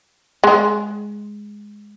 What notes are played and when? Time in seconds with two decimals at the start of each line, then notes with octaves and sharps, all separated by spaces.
0.44 G#3